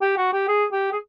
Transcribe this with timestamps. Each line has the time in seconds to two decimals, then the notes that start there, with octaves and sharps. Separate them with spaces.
0.02 G4
0.17 F#4
0.33 G4
0.48 G#4
0.72 G4
0.92 G#4